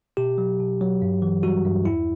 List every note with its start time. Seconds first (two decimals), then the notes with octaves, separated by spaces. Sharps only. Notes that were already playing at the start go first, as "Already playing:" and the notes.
0.17 B2 G4
0.38 F#3
0.60 B2
0.81 F#3
1.02 G2
1.22 E3
1.43 G3 F#4
1.65 G2
1.85 E2 E4